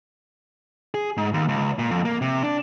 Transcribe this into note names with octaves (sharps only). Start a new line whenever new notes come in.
G#4
G#2
D#2
C#2
A#2
F2
A#3
C3
D4